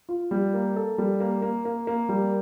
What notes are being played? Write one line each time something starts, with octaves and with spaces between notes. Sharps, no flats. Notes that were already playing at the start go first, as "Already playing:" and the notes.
F4
G3
A#3
A4
G3
A#3
A#3
A#3
A#3
G3